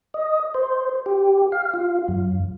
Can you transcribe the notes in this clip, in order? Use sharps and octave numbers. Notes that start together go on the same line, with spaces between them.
D#5
C5
G4
F5
F4
F#2